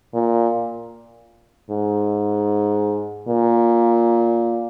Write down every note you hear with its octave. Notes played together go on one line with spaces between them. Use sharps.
A#2
G#2
A#2